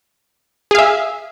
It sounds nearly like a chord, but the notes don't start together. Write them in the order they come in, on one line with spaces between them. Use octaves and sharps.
G#4 F5 E5